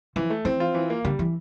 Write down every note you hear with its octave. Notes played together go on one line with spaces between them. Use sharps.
E3 F3
A3
E3 C4
F4
E3
A#3
D3 G3
E3